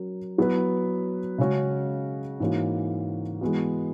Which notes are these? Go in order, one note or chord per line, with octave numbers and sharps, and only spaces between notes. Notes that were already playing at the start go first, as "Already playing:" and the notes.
Already playing: F#3 C#4 F#4 A#4
F#3 B3 E4 B4
C#3 G#3 C#4 F#4
G#2 E3 A#3 C#4 F#4
E3 G#3 B3 F#4